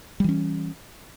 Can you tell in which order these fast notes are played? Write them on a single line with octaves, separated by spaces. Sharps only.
G3 E3 C#4